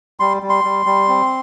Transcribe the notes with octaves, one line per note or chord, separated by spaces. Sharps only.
G3 C6
G3
C6
G3
G3
C4